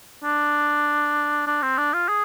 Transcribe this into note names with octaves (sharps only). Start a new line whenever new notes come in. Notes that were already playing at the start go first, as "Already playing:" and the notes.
D4
D4
C4
D4
F4
G#4